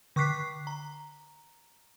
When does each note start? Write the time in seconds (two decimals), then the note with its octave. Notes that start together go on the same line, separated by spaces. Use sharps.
0.16 D3 C#6 D6 F#6 B6 C7
0.67 A#5